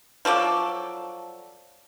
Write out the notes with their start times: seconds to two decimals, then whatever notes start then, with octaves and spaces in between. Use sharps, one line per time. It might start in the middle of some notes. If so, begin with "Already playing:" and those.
0.25 F3 F#3 A4 D5